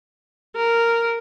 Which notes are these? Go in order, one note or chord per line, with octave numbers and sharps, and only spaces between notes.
A#4